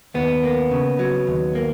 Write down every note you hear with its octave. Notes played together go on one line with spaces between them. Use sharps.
D#2 B3
A#3
C#3
F#3
D#2
A#3